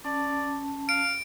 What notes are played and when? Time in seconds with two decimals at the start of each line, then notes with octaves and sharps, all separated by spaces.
0.05 C#4 D5 A5
0.89 F5 D7